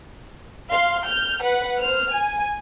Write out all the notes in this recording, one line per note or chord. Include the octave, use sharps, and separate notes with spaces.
F5 C6
F6 G6
B4 F#5
C5 F6
G#5